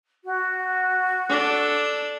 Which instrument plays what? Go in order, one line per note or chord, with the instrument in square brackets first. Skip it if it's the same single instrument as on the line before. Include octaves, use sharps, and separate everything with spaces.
[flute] F#4
[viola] D4 A4